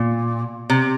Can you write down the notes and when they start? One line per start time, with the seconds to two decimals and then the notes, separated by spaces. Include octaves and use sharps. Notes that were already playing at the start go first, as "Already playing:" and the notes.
Already playing: A#2
0.70 C3